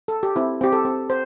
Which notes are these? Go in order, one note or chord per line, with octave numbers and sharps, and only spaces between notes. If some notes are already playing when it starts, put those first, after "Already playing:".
A4
G4
C4 E4
C4 G4
A4
C4
C5